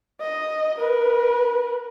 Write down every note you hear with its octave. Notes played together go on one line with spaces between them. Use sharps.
D#5
A#4 B4